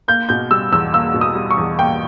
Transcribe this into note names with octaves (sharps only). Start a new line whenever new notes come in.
A#3 G6
B2 G6
G3 E6
E2 E6
A#3 E6
B2
D#6
G3
C#6
E2
A#3 G5